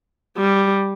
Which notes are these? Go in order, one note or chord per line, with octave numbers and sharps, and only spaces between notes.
G3